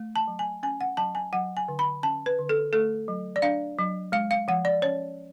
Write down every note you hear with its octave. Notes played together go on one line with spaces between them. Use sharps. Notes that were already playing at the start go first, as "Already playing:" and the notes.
Already playing: A3
A5
F#3
G#5
C#4 G#5
F#5
F#3 A5
G#5
F#3 F#5
G#5
D3
B5
C#4 A5
B4
D3
A4
A3 A4
F#3
D5
D4 F5
F#3
G#3 F5
F5
F3 F#5
D5
C#4 C#5